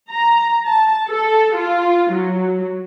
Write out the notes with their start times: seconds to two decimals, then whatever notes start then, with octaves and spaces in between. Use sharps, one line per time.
0.10 A#5
0.66 A5
1.10 A4
1.56 F4
2.12 F#3